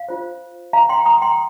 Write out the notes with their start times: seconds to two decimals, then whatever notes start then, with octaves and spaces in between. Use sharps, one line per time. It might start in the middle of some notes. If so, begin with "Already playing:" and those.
Already playing: F5
0.08 F4 C5
0.73 F5 A#5
0.89 G5 C6
1.06 A#5 D#6
1.22 G5 C6